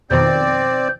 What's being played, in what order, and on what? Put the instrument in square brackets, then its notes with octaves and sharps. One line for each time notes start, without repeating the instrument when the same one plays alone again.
[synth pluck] F2 B2 D#3 [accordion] C4 D5 [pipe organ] C5